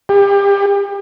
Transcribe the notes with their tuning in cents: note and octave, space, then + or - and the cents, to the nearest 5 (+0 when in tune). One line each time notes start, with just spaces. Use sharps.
G4 +30